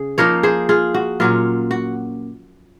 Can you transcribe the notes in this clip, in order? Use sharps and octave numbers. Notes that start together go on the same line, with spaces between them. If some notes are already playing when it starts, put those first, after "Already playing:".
Already playing: C#3 C#4 G#4
F3 A#3 D#4 A#4 C#5
G#4 C5
F4 G#4
F#4
A#2 F#3 C#4 F4
F#4